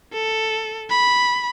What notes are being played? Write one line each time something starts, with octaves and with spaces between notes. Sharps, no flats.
A4
B5